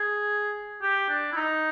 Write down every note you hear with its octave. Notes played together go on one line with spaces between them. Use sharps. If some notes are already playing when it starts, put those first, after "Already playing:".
Already playing: G#4
G4
D4
E4
D#4